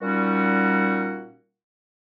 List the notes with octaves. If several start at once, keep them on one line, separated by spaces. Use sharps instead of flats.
A#2 G3 C#4 D#4 F#4